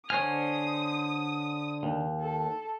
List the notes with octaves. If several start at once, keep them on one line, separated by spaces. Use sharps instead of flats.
D3 C5 C#5 G#5 D#6 F6
D#2
A4